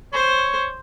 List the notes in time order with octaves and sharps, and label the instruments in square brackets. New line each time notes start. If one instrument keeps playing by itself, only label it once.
[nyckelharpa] C5 [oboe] C#5